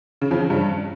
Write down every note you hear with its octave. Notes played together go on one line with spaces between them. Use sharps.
C#3
F2
C#3
G2